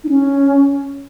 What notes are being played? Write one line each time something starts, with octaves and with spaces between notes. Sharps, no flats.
D#4
C#4